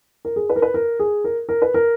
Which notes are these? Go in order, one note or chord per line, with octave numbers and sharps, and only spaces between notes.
A#4
G#4
B4
A#4
B4
A#4
G#4
A#4
A#4
B4
A#4